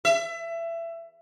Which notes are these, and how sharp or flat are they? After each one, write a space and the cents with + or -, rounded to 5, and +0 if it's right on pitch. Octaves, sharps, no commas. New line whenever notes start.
E5 +25